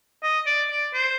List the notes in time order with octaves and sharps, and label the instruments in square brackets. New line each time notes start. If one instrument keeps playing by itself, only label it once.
[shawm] D#5
D5
D5
C5